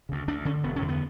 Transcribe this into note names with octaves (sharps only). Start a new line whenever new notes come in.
D2 C#3
D2 D4
D3 C#4
E1 B3
C#4
E2 D3
B3